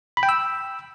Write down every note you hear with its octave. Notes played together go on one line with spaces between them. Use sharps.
B5
G5
E6